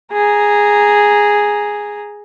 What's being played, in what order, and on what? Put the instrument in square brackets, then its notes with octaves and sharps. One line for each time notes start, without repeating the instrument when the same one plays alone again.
[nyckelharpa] G#4 A#5